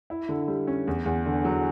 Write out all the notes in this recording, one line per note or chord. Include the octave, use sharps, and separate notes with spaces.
E4
D3
G3
C#4
E2
E2
D3
F#3